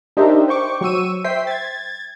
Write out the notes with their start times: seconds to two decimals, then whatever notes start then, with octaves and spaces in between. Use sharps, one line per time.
0.17 D4 D#4 G4 A#4 C5 E5
0.48 C5 G5 C#6 D6
0.81 F#3 C#6 E6 D#7
1.24 C5 E5 G5 B6 C7
1.47 G#6 A6